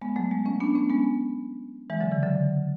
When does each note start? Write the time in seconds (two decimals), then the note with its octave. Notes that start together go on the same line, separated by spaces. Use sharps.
0.02 G#3 B3
0.16 F#3 A3
0.31 G#3 B3
0.46 A3 C#4
0.60 B3 D4
0.75 A3 C#4
0.90 G#3 B3
1.90 E3 G#3
2.00 D3 F#3
2.12 C#3 E3
2.23 D3 F#3